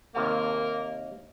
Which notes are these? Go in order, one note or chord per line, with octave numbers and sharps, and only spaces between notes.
D#2 C3 A#3 F5